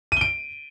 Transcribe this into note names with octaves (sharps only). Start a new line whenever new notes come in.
D7 D#7 G7